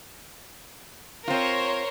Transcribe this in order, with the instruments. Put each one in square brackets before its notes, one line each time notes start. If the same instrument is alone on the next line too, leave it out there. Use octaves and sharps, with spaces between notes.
[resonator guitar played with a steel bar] C4 F4 [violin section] A#4 C5 C#5